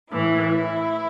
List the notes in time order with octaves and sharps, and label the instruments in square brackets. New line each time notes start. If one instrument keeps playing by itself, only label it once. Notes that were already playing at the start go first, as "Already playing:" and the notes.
[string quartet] A2 E3 E4